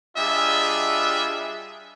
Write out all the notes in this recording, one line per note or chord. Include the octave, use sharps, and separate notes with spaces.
G3 D4 F4 G#4 D#5 E5